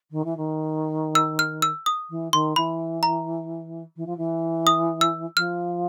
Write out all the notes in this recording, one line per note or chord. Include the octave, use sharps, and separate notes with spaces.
D#3
E3
D#3
E6
F6
E6
D#6
E3
D#3 C6
E3 B5
A#5
E3
F3
E3
D#6
E6
F3 F6